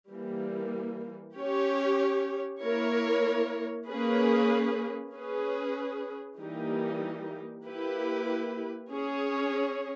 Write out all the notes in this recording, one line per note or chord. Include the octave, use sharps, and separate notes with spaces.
E3 G3 A#3
C#4 G4 C#5
A#3 E4 A#4 C#5
A#3 C#4 G#4 B4
C#4 G#4 B4
E3 G3 A#3 D#4 G4
A#3 E4 G4 B4
C#4 G#4 C#5